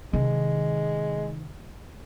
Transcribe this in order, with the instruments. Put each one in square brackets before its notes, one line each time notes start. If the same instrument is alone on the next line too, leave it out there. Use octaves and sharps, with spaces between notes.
[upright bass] C3 D#3 [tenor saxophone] G#3